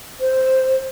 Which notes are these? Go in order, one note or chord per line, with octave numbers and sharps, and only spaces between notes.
C5